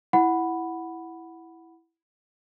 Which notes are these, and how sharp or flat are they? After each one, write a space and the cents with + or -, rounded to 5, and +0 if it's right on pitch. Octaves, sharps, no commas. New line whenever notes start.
E4 +0 F#5 +0 B5 +0